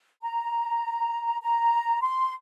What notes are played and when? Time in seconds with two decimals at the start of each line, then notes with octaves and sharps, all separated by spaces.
0.22 A#5
1.42 A#5
2.02 C6